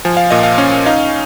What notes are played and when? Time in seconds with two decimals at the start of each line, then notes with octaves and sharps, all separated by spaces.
0.05 F3 G#5
0.17 F5
0.30 A#2 D#5
0.43 F5
0.58 C#4
0.86 D#4 F5